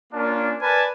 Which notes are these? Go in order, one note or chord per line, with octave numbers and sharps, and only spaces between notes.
A#3 C#4 D4 F4 A#4
A#4 B4 D5 G#5 A5